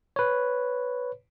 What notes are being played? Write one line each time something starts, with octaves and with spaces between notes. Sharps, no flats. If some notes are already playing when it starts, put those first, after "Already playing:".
B4 C#5